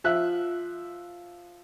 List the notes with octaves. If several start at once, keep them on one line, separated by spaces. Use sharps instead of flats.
F3 E5 F#6